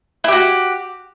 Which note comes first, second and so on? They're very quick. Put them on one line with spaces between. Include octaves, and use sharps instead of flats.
E4 G4 F#4